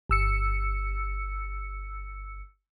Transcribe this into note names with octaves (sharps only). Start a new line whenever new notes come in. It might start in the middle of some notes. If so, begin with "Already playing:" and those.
G1 E6 C#7